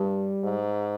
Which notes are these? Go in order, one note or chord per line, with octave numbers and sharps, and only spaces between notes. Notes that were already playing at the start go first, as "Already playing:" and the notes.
Already playing: G2 G3
G#2